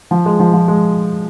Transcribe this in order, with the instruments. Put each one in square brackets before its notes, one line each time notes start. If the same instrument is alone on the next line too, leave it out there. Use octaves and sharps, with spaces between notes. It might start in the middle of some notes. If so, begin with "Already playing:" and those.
[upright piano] F3
G#3
F3
F3
G#3